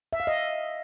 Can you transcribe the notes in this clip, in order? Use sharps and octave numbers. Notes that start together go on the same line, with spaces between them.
E5
F5
D#5